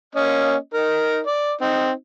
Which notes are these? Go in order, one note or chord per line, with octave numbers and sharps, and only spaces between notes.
A#3 C#4 D#5
D#4 A#4
D5
C4 D#4